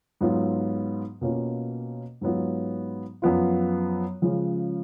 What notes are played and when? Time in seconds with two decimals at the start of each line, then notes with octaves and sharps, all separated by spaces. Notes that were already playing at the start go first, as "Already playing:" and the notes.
0.21 G#2 F#3 B3 F4
1.21 B2 A#3 C#4 F4
2.21 G#2 F#3 B3 F4
3.22 F#2 F3 B3 F4
4.22 C#3 F3 G#3 C#4